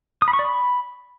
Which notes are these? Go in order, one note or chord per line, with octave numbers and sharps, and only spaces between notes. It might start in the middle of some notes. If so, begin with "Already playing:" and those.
D#6
B5
C#6
D5
B5